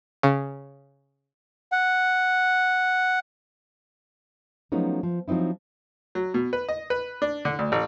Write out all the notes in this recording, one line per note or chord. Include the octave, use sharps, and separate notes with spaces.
C#3
F#5
F3 F#3 A3 B3 C#4 D#4
F3
F3 F#3 C4 D#4 E4
F#3
B2
B4
D#5
B4
D4
D3
D2
A1